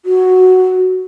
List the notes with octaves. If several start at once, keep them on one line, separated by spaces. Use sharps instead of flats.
F#4